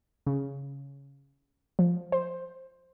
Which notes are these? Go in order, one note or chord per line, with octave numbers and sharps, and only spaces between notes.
C#3
F3
C5